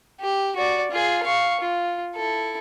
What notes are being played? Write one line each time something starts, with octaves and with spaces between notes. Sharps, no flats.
G4
F#4 D5
F4 G#4
F5 C#6
F4
E4 A4